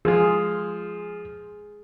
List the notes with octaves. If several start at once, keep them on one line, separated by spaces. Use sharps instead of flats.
F3 G#3 F4 G#4